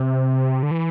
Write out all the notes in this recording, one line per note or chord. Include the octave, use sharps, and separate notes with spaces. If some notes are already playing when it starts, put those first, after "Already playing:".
Already playing: C3
D3
E3